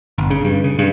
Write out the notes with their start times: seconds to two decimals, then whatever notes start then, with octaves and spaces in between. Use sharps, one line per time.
0.18 G1
0.30 C#3
0.45 G2
0.64 C#3
0.79 G2